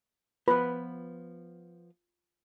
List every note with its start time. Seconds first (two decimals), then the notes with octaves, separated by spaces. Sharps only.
0.48 F3 B3 F4 B4